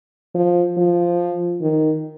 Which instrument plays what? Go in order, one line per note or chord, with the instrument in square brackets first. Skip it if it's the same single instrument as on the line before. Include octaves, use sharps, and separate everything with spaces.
[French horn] F3
F3
D#3